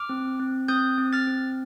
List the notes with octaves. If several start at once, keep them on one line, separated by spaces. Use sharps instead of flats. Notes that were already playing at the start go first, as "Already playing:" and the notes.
Already playing: D6 F6
C4
C4
C4 D#6 G6
C4
F6 A6
C4